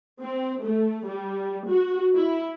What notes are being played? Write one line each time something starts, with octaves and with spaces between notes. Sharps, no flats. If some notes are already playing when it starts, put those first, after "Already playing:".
C4
A3
G3
F#4
E4